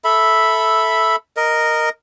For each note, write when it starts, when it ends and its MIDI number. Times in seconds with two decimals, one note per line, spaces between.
0.04 1.16 69
0.04 1.16 76
0.04 1.16 83
1.37 1.89 70
1.37 1.89 75